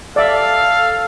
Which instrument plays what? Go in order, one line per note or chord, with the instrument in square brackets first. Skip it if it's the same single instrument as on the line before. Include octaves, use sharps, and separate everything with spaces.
[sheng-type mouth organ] A4 [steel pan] D5 E5 [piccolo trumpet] F5